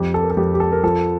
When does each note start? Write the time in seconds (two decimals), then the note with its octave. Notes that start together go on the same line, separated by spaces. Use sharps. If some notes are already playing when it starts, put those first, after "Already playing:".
Already playing: F2 G4
0.14 A4
0.24 A#4
0.30 A4
0.37 F2 G4
0.54 G4
0.60 A4
0.72 A#4
0.83 F3 A4